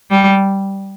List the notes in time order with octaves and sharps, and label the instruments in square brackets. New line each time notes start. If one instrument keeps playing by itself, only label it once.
[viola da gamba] G3